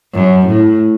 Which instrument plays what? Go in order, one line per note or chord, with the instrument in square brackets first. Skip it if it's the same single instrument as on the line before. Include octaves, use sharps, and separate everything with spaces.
[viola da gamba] F#2
A2